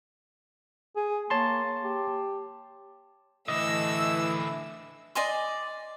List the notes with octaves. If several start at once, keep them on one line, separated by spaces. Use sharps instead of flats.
G#4
A#3 C#5 A5 C6
G4
D3 E3 A3 E4 D#5 E6
D5 D#5 G#5 C6